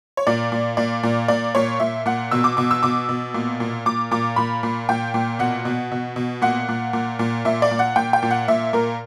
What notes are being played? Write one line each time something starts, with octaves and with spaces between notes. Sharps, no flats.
C#5
A#2 D5
A#2
A#2 D5
A#2
A#2 D5
A#2 C#5
A#2 E5
A#2 F#5
B2 E6
D6
B2 D6
E6
B2 D6
B2
A#2
A#2
A#2 D6
A#2 D6
A#2 B5
A#2
A#2 G5
A#2
B2 F#5
B2
B2
B2
A#2 F#5
A#2
A#2
A#2
A#2 E5
D5
A#2
F#5
A#2 G5
G5
A#2
F#5
A#2 E5
A#2 A#4